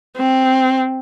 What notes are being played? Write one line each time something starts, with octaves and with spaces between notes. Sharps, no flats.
C4